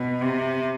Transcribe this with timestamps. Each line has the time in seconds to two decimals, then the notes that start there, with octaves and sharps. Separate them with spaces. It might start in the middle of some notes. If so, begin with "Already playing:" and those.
Already playing: B2
0.21 C3